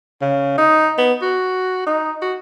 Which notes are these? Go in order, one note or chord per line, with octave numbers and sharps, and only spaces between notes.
C#3
D#4
B3
F#4
D#4
F#4